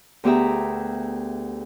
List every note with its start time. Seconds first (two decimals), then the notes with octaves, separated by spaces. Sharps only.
0.24 D2 B3 G4 G#4 E5 A#5